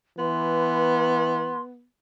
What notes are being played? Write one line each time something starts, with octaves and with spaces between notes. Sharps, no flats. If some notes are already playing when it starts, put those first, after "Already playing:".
E3 B3 C6